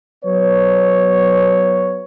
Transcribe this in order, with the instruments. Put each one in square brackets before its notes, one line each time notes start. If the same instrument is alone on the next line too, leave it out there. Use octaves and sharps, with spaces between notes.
[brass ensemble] F#3 B3 B4 C#5